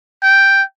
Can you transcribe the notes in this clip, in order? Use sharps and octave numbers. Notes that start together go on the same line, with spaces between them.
G5